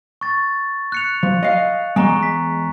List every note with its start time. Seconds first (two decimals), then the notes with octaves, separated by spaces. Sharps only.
0.21 C#6 A6
0.92 F#6 C#7 F7
1.23 F3
1.43 D#5 F5
1.96 E2 G#3 G#5 A#5 C#6
2.23 B6